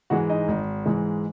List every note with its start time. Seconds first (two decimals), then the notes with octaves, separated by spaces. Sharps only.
0.10 G#2 E3 G#3 F#4 F#5
0.30 D#4 D#5
0.48 G#1
0.86 G#2 E3 G#3